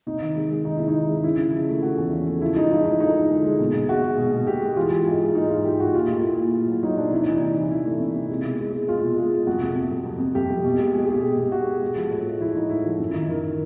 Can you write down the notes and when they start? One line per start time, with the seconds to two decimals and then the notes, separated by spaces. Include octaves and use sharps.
0.07 C3 D#4
0.21 D#3
0.35 G#3
0.51 G#3
0.65 D#3 D#4
0.77 C3 E4
0.88 D#4
0.95 D#3
1.10 G#3
1.24 C#3 E4
1.38 C#3
1.53 F3
1.68 A3
1.83 A3 F#4
1.98 E2
2.13 C#3
2.27 A3
2.41 F3 E4
2.56 G#3 D#4
2.71 F3 D#4
2.85 G#3 D#4
3.00 D3 D#4
3.15 D3
3.30 G#3
3.44 G#3
3.59 B2
3.74 B2
3.89 G#3 F#4
4.03 G#3
4.18 B2
4.32 B2
4.47 G#3 G4
4.62 G#3
4.76 E3 F4
4.91 G#3
5.07 G#2
5.21 G#2
5.35 G#3 D#4
5.50 G#3 F4
5.65 G#2 G4
5.79 G#2 F#4
5.95 A#2 F4
6.08 A3 F4
6.23 A#2 E4
6.38 A#2
6.53 A#2
6.68 F#3
6.83 F#3 D#4
6.97 A#2 D4
7.12 C3 E4
7.19 D#4
7.26 E3 D4
7.35 D#4
7.41 C3
7.56 E3
7.71 E3 E4
7.85 A3
8.00 C3
8.14 C3
8.29 G#3
8.44 B2
8.59 G#3
8.73 G#3
8.88 G#3 F4
9.02 B2
9.17 G#3
9.31 G#3
9.47 F2 F#4
9.62 C3
9.76 C3
9.91 F2
10.05 F2
10.20 F2
10.35 F2 G4
10.50 F2
10.64 B2
10.79 G#3
10.93 G#3 G#4
11.04 G#4
11.09 G#3
11.14 G4
11.23 B2
11.37 B2
11.52 G#3 F#4
11.67 G#3
11.82 G#3
11.96 F3
12.11 A2
12.26 G#3
12.40 F3 E4
12.55 F3 D#4
12.70 A2 E4
12.85 F3
13.00 F#2
13.14 D#3
13.29 D#3 A#4